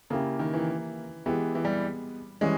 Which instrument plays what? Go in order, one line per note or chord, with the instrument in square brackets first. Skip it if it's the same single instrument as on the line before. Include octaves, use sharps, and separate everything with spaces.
[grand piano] C#3 [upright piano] A#3 E4 G4
[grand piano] D#3
E3
[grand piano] E3 [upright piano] G#3 B3 G4
[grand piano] E3
G3
[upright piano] E3 G3 C#4 [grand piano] G#3